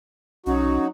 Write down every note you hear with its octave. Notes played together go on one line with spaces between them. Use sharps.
B1 F#3 C#4 D#4 F#4